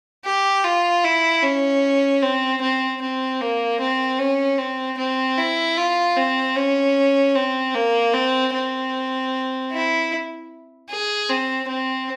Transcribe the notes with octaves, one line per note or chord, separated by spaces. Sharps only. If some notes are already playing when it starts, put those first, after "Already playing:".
G4
F4
E4
C#4
C4
C4
C4
A#3
C4
C#4
C4
C4
E4
F4
C4
C#4
C4
A#3
C4
C4
E4
G#4
C4
C4